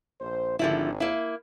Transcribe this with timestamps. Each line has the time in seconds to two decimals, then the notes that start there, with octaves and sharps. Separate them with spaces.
0.21 A#1 C5
0.59 G#1 D3 F3 E4
1.00 A#3 E4